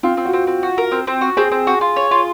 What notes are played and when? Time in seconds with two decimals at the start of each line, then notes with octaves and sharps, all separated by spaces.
0.03 C4 F4
0.17 C4
0.25 F#4
0.33 C4
0.47 C4
0.63 F#4
0.78 A#4
0.92 C4
1.07 C4
1.21 F#4
1.37 C4 G#4
1.51 C4
1.67 F#4
1.81 F4
1.96 C#5
2.11 F4